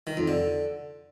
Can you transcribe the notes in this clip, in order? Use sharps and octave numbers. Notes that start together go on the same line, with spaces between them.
D#3
F2
D3